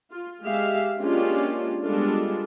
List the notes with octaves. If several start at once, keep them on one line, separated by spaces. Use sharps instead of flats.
F4
G#3 G4 E5 F5
G#3 A#3 C#4 D4 F4 G4
G3 G#3 B3 D4 F4 A4